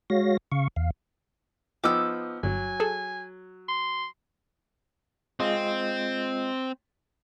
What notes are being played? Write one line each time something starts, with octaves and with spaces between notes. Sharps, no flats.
G#3 F#4 C#5 F5 A#6
C#3 F5 C#6
E2 F5
F3 B3 D#4 D6 E6
G1 F#3 G#5
G#4 A4
C6
G#3 C4 F4 D#5